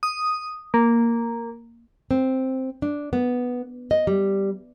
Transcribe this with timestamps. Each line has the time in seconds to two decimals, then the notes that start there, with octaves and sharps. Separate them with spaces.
0.03 D#6
0.74 A#3
2.11 C4
2.82 D4
3.13 B3
3.91 D#5
4.07 G3